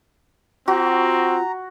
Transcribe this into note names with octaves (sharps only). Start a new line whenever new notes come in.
C4 F4 F#4 A#5